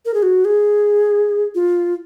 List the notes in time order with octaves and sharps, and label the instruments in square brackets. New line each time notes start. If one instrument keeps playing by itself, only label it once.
[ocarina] A#4
G#4
F#4
G#4
F4